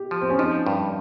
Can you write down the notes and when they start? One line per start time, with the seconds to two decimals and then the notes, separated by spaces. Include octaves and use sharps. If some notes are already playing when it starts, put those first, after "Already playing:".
Already playing: G4
0.11 F3
0.21 C4
0.30 C#4
0.38 F3 D#4
0.67 G2